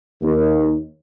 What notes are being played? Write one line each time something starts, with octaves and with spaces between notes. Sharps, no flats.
D#2